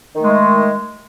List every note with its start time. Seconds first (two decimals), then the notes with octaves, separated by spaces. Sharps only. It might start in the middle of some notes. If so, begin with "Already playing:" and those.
0.16 D#3
0.20 A3
0.24 G#3